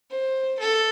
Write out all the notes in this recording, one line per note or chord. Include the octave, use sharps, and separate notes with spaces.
C5
A4